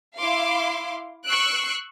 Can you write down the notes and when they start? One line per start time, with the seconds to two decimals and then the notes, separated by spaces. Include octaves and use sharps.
0.18 E4 F5 C6 D6
1.26 C#6 E6 F#6 C7 D7